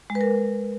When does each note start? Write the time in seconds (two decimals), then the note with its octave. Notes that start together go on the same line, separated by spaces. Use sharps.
0.10 G#3
0.15 B4
0.21 A#4